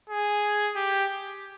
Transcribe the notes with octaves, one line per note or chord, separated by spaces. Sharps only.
G#4
G4